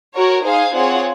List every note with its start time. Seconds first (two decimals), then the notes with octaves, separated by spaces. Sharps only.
0.15 F#4 A#4 C#5
0.44 D#4 G#4 C5 F5 G#5
0.74 C4 F4 G#4 C#5 F#5